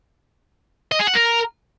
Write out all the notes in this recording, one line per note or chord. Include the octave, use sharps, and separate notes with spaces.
D#5
G#4
F#5
A#4